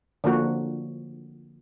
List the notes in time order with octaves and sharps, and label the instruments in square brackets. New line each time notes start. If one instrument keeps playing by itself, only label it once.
[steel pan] D3 F3 A#3 F#4